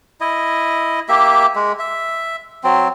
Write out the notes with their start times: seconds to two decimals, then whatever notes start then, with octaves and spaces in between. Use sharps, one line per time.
0.21 E4 D#5
1.09 A#3 G4 E5
1.55 G#3
1.79 E5
2.64 F#3 C4